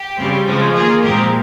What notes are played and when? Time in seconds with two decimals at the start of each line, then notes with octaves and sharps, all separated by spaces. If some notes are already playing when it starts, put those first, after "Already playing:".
Already playing: G4
0.17 C#3 G3 C4
0.46 C#3 F3 G#3 C4
0.74 D#3 A#3 F4 G#4
1.02 A#2 F3 G#3 C4 G4 A#4